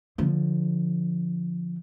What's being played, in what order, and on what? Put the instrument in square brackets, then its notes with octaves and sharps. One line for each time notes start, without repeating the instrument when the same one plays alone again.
[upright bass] D3 F3